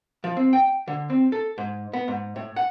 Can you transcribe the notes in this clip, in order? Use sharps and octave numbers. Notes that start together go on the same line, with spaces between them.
F3
C4
G5
D3
C4
A4
G#2
B3
G#2
A2
F#5